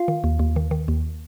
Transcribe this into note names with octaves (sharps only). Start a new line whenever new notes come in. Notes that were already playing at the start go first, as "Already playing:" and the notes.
Already playing: F4 F5
D#3
D#2
D#2
D#3
D#3
D#2